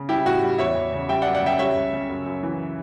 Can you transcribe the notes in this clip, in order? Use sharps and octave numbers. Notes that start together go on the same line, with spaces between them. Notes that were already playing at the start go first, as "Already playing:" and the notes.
Already playing: C#3
G3 E4 G4
A2 F#4
G3
E2 C#5 E5
E2
C#3
G3 E5 G5
D5 F#5
F#2
D5 F#5
C#3 E5 G5
G3 C#5 E5
C#2
C#3
F#2
F#2
E3